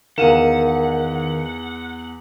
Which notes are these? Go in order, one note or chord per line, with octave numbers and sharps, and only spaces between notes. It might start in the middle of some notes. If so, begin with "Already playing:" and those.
E2 D#3 A#4 F5 F#5 D#7 E7